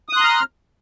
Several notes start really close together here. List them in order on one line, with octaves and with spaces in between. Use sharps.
D#6 F#6 C6 A#5 F6